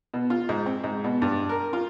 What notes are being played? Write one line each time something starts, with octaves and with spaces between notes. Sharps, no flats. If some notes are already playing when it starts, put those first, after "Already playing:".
B2
F4
G#2
C4
G#2
B2
G2
A#4
F4